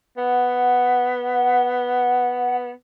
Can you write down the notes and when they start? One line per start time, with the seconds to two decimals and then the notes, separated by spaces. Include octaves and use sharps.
0.17 B3 F#5